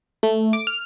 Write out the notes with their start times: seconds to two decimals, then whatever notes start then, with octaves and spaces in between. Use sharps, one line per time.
0.23 A3
0.53 D6
0.67 F6